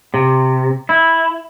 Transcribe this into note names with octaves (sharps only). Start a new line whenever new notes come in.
C3
E4